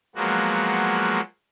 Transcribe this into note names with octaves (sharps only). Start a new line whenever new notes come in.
F3 F#3 G#3 A#3 B3 F#4